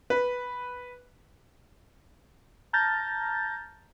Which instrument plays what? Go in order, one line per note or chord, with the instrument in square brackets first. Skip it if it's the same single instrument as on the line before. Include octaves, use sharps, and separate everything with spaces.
[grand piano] B4
[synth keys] A5 A#5 F6 G6 A6 A#6